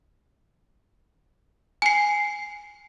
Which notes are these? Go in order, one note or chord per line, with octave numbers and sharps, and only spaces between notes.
G#5 C7